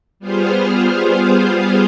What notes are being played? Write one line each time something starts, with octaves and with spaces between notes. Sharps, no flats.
G3 B3 F4 G#4 C5 F5